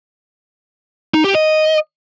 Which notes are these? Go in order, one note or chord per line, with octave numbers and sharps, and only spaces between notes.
D#4
G4
D#5